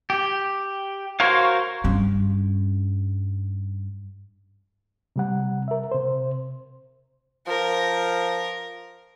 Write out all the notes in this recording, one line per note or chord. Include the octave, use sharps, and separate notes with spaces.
G4
F#4 A#4 C5 C#5 F5
G2 C#4
C3 G3 F#5
A#4 E5
C3 C5
F3 A#4